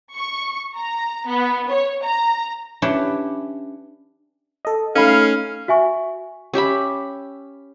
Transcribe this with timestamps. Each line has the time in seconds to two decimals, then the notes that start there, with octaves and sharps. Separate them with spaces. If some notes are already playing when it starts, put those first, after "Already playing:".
0.14 C#6
0.75 A#5
1.26 B3
1.69 C#5
2.03 A#5
2.82 C#4 D4 E4 G4 B4
4.65 A4 D#5
4.95 A3 C#4 D#4 A4 F5 B5
5.68 F#4 E5 G#5 C#6
6.54 C#4 G4 E5 B5